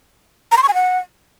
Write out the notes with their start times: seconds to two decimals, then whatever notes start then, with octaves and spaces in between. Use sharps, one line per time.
0.52 A#5
0.57 C6
0.63 C#6
0.68 G#5
0.74 F#5